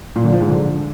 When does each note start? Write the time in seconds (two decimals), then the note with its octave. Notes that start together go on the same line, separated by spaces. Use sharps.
0.16 A#2
0.24 D3
0.32 F3
0.41 G#2
0.49 D3